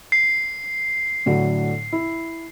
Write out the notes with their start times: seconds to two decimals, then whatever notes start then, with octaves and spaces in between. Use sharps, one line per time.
0.12 C7
1.26 A2 D3 F#3
1.92 E4